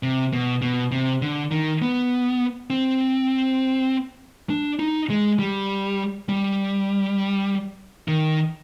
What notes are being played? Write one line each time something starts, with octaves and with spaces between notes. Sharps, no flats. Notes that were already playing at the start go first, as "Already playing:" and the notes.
C3
B2
B2
C3
D3
D#3
B3
C4
D4
D#4
G#3
G3
G3
D#3